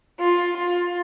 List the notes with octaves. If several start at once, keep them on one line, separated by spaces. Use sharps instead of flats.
F4
F4